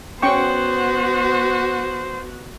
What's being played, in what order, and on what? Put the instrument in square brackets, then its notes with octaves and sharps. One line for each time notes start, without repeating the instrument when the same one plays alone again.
[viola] B3 F#4 [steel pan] C#4 G5 C#6 [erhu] C5